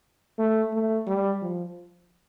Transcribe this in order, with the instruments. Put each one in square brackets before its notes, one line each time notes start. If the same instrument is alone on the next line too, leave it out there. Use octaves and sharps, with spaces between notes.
[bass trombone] A3
A3
G3
F3